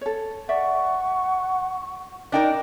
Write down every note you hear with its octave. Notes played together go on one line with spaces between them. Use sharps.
A4 C#5
D5 E5 F#5 C#6
D4 D#4 A#4 D5 G5